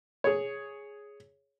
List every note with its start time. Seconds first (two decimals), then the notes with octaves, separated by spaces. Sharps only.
0.24 G#4 C#5